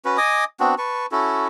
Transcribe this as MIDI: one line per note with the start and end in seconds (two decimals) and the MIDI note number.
0.05 0.17 61
0.05 0.17 66
0.05 0.17 71
0.17 0.44 75
0.17 0.44 80
0.17 0.44 86
0.17 0.44 87
0.60 0.75 59
0.60 0.75 60
0.60 0.75 62
0.60 0.75 66
0.78 1.06 71
0.78 1.06 81
0.78 1.06 85
1.12 1.48 61
1.12 1.48 64
1.12 1.48 66
1.12 1.48 69